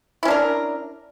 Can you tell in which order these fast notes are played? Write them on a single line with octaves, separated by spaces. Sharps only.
E4 C#4 D4 A#4